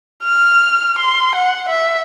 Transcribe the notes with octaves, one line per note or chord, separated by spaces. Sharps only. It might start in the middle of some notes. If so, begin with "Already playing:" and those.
F6
C6
F#5
E5